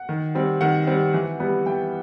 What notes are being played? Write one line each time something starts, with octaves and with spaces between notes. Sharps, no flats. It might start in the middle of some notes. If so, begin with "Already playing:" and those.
Already playing: F#5
D#3
G3 C4
D#3 F#5
G3 C4
E3
G3 B3
E3 G5